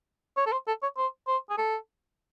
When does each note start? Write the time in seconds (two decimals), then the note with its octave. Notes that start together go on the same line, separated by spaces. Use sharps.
0.37 C#5
0.47 A4
0.52 C5
0.68 A4
0.82 C#5
0.97 C5
1.27 C5
1.50 G#4
1.58 A4